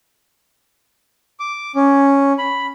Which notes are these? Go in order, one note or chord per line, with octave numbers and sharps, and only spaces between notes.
D6
C#4
B5